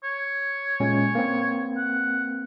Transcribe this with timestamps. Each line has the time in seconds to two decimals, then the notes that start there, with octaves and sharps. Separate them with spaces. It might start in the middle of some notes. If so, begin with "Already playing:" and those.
0.03 C#5
0.80 A#2 G#3 C#4
1.15 A#3 C4
1.77 F#5